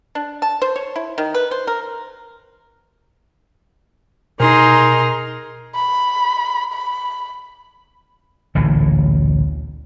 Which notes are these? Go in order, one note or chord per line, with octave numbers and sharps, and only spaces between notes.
D4
A5
C5
C#5
E4
D#3
B4
C5
A#4
B2 D#4 G#4 A#4 C6
B5
B5
A1 D2 A#2 E3